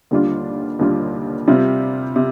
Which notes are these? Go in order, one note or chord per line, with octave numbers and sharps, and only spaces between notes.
D#2 D3 G3 D4 F4
D#2 D3 G3 D4 F4
C3 G3 C4 F4
C3